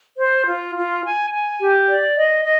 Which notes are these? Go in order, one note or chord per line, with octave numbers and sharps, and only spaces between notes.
C5
F4
F4
G#5
G#5
G4
D5
D#5
D#5